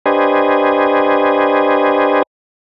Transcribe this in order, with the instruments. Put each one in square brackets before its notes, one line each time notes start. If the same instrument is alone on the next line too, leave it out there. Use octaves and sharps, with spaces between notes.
[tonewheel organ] D4 G4 B4 C5 D#5 G#5